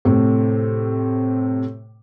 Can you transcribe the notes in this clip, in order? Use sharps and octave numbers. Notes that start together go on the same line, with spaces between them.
A2 C3